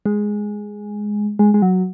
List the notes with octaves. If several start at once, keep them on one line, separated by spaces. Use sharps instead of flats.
G#3
G#3
G#3
F#3